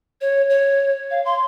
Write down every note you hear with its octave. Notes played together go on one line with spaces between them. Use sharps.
C#5
C#5
F5
C6